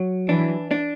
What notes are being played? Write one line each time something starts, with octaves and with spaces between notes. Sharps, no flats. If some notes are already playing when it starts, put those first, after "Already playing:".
Already playing: F#3
E3 D4
D4